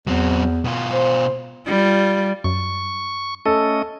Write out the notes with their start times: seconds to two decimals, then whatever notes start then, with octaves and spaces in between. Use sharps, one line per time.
0.07 E2 F#3 C4
0.64 B2 F4
0.92 C5
1.66 G3 F4
2.44 F#2 C#6
3.46 A3 C#4 A4 D#5